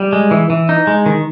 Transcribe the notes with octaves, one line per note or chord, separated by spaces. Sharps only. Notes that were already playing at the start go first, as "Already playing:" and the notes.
Already playing: G3
G#3
E3
E3
D#4
G#3
D#3